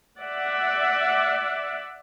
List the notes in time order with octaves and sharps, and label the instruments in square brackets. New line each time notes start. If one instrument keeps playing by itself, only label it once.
[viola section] D5 E5 F#5